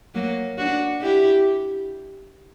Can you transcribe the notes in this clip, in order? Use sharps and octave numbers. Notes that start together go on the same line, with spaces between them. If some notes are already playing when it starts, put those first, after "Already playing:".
F#3 A#3
D4 F#4
E4 G4